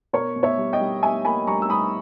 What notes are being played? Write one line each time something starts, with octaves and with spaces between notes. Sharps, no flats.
B2 A#4 C#5
B2
C#5 E5
G3
D#5 G5
G3
G3 E5 G#5
A#3 G#5 B5
G3 A#5 C#6
E6
G3 B5 D#6